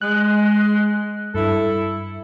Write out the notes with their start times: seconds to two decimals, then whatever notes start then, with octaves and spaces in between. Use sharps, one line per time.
0.01 G#3 F#6
1.34 G2 E4 A4